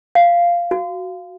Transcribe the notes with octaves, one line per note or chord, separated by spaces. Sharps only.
F5
F#4